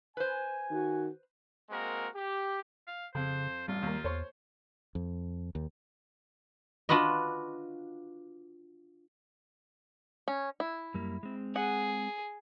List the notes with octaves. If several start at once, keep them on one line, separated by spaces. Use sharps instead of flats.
B4 C5 G#5
D#3 F#4
G#3 A#3 C4 F#4 A#4
G4
F5
F2 C#3 C5
A1 G3 F4
D#2 A#3
E2 C5 C#5 C6
F2
D#2
D4 F4 F#4 B4 D#5
C#4
E4
F#2 G3 A#3
G#3 C4
G#4 F#5